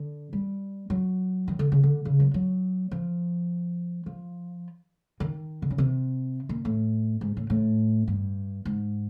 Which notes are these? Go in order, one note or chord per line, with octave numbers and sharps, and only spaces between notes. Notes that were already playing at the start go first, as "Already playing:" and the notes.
Already playing: D3
G3
F#3
D#3
D3
C#3
D3
C#3
F#3
F#3
F3
F3
D#3
D3
C#3
C3
A#2
A2
G#2
A2
A2
G2
G#2